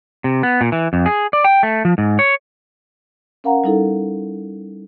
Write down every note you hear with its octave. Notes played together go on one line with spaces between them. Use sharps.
C3
B3
A#2
E3
F2
G#4
D5
G5
A3
F3
G#2
C#5
C#4 A#4 F5 F#5 A#5
G3 D#4 E4 A4